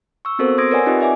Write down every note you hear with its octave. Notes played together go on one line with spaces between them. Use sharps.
C#6 E6
B3 C4 F#4 A4 A#4 C5
C6 D#6 E6 G#6 A#6 D7
A#4 B4 C#5 D5 F#5 G#5
C4 D#4 F4 G4 D5 D#5
D5 E5 G#5 D6